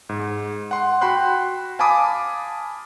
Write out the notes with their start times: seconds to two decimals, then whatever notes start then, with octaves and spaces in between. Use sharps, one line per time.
0.09 G#2
0.71 F#5 C6
1.01 F#4 G5 B5 C6 F#6
1.79 F5 G#5 A5 B5 D6 D#6